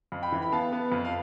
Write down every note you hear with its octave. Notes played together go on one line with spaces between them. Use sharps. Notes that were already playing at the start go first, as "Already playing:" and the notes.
F2
G5 B5
E3
B5
B3 F5 A5
B3
F2
F5